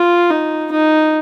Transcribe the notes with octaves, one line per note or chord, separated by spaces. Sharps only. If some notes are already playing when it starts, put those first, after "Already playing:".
Already playing: F4
D#4
D#4